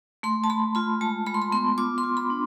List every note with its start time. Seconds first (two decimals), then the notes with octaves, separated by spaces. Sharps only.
0.23 A3 C6
0.44 A5
0.50 A3 B5
0.75 F4 B5
1.01 G#3 A5
1.26 G#3 B5
1.34 C6
1.42 B5
1.52 B3 C6
1.78 F4 D6
1.98 C6
2.03 F4
2.17 B5
2.30 D4